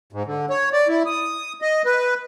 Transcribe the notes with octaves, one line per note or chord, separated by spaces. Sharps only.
G#2
D3
C#5
D5
E4
D#6
D#5
B4